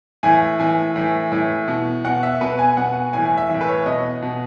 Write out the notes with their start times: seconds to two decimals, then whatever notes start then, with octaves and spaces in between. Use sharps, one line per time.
0.23 A2 E3 G#5
0.59 A2 E3 G#5
0.96 A2 E3
1.32 A2 E3
1.68 B2
2.04 B2 F#5
2.23 E5
2.41 B2 B4
2.59 G#5
2.77 B2 F#5
3.13 A2 E3 G#5
3.25 G#5
3.38 E5
3.49 A2 E3
3.61 B4
3.68 C#5
3.86 B2 D#5
4.22 B2